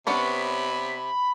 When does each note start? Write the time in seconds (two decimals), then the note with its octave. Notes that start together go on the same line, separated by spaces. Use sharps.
0.07 C3 B3 C#4 D4 B5